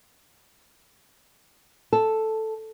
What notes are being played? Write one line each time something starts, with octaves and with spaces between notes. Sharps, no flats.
A4